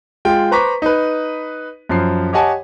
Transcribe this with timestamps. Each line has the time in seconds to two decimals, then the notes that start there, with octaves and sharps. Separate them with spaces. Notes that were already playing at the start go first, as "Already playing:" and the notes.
0.25 G#3 F4 G5
0.51 B4 C5 A#5 C#6 D6 B6
0.82 D#4 B4
1.89 F#2 F3 C7
2.33 G4 C#5 D#5 F#5 G#5 A5